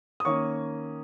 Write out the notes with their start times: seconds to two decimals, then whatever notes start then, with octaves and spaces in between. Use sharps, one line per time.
0.20 D#6
0.25 D#3 A#3 C#4 C#6